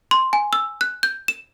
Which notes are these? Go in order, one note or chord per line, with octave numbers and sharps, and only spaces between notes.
C6
G#5
E6
F#6
G6
E7